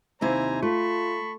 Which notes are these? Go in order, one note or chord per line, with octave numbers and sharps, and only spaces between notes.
D#2 C3 E4 C5 G#5 A#5
A3 F4 A5 B5 C#6